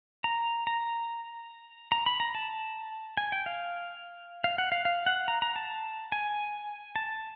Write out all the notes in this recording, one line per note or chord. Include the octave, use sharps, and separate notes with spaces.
A#5
A#5
A#5
B5
A#5
A5
G#5
G5
F5
F5
F#5
F5
F5
F#5
A#5
A#5
A5
G#5
A5